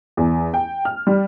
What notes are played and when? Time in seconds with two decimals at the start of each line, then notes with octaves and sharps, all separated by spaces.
0.17 E2
0.54 G5
0.85 F6
1.07 G3